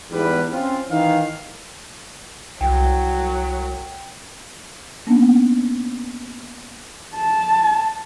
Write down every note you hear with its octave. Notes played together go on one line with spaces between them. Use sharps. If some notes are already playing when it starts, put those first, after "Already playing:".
E2 G#2 G3 B4
C4 C#4 F4
D#3 E3 F5
C2 F#3 G5
A#3 B3 C#4 D4
A5